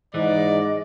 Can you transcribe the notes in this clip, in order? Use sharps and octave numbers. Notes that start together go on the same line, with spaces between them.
G#2 E3 D5 D#5